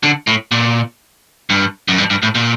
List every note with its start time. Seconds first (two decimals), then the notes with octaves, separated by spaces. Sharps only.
0.03 D3
0.27 A2
0.52 A#2
1.50 G2
1.88 F#2
1.98 G2
2.10 G2
2.23 A2
2.35 A#2